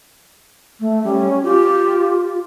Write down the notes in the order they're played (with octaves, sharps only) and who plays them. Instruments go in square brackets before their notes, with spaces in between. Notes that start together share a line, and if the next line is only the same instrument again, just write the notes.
[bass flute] A3
[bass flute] G3 [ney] C#4
[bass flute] F4 [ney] G4